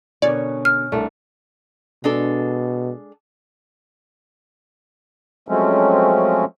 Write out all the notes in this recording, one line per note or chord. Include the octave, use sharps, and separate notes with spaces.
B2 D3 C#4 A#4 C#5 D5
F6
C2 A3 D4
B2 G#3 D4 A4
F3 F#3 G#3 A3 C4 C#4